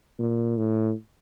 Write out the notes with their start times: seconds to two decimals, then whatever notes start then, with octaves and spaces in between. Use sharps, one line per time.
0.20 A#2
0.57 A2